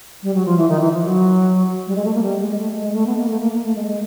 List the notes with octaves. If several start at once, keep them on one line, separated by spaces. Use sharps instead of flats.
G3
F#3
F3
E3
D#3
E3
F3
F#3
G3
G#3
A3
A#3
G3
G#3
A3
G#3
A3
B3
A#3
A3
A#3
A#3
A3
G#3
G#3